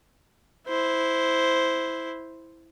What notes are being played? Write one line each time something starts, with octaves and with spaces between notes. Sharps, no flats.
E4 C5